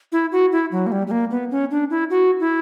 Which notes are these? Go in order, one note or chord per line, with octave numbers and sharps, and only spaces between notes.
E4
F#4
E4
F#3
A#3
G3
G3
A#3
B3
C#4
D4
E4
F#4
E4